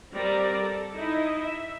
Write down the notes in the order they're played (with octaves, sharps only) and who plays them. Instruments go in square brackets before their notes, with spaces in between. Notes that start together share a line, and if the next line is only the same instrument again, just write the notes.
[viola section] G3 C4 A#4 D5 A#5
A4
D#4 E4 D#5
E5